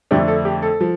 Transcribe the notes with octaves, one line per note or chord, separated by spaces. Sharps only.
F2 D3 A3 D4 G4
A4
G4
A4
F3